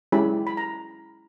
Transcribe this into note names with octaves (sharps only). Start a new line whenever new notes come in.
G#3 C#4 E4 G4 B5
B5
A#5